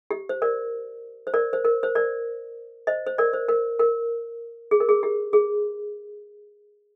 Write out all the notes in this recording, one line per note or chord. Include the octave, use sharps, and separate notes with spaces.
G4
C5
A#4 D5
C5
A#4 D5
C5
A#4
C5
A#4 D5
C5 D#5
C5
A#4 D5
C5
A#4
A#4
G#4
A#4
G#4
G4
G#4